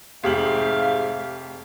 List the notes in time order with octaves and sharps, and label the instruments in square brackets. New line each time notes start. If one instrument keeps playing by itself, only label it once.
[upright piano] F1 G4 F#7 [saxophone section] G#2 A3 F5